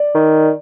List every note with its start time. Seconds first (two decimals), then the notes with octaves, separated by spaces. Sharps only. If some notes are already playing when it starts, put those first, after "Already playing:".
Already playing: D5
0.14 D#3